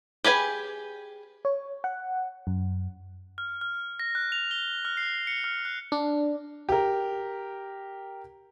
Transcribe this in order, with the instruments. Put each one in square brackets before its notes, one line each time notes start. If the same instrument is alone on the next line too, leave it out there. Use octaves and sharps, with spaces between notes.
[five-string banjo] G4 G#4 B4 G#5
[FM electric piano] C#5
F#5
F#2
[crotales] F6
F6
A#6
F#6
F7
G7
F6
C7
C#7
F6
F#6
[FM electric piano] D4
[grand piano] G4 A#4